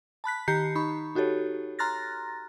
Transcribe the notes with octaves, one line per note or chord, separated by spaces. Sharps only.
A5 B5 F#6 B6
D#3 G4 A#5 G6 C7 C#7
D#4 B5 C#6
D#4 F#4 G4 A4 C#5
A#5 C6 F6 F#6 A6 A#6